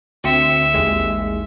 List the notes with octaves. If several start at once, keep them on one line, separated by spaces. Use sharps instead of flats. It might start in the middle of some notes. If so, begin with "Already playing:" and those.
D2 C4 E5 C#7
A1 D#2 G#3